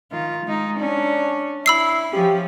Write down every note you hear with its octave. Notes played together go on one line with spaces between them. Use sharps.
D#3 F4
G#3 D#4
C#4 D4
E4 B5 E6 C7
F3 C#4 G4